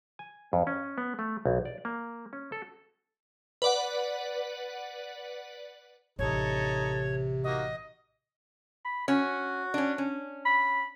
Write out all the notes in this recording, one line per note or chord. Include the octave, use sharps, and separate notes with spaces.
G#5
F2
C#4
B3
A3
B1
D5
A#3
C#4
A4
B4 D5 F#5
A1 C3 D#4 A4 C#5
A#3 D#4 F#4 D#5
B5
C#4 F#4
C#4 D4
C#4
B5